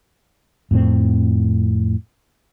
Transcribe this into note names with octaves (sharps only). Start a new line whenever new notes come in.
F2 A2 C4